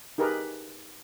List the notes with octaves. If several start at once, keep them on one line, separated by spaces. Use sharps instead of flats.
D#4 G4 G#4 A#4 B4